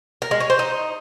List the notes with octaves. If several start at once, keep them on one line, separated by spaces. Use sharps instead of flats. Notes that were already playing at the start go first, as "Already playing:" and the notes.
A#4
G#3
C#4
C5
D#4